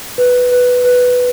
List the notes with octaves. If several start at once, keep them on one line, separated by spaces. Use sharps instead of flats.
B4
B4
B4